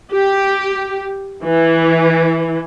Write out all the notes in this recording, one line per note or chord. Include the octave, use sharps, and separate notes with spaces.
G4
E3